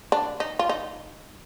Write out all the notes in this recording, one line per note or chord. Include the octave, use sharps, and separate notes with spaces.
D4
D#4
F4
D#4